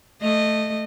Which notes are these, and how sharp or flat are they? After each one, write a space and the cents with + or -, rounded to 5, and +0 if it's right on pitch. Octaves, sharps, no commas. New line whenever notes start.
A3 +0 D#5 -20